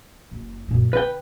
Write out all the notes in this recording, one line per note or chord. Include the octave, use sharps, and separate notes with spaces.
F#1
F#2 A#2
D3 B4 G5